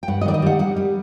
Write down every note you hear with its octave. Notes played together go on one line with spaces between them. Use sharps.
G5
G2 F#5
D#5
D#3 D5
D#5
G3 F#5
G3 F#5
G3